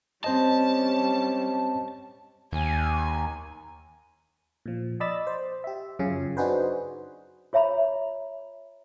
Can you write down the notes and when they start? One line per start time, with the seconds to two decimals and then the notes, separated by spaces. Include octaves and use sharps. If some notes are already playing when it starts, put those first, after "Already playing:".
0.24 G3 C4 C#4 C5 D#5 A5
2.53 D#2 G#5
4.66 A#2 F3
5.00 D5 D#5 B5 E6 A6
5.27 C5
5.64 G4 E5
5.99 F#2 C#3 F4 G#5
6.37 D4 D#4 F#4 G#4 B4 C5
7.53 F4 C#5 E5 A#5 B5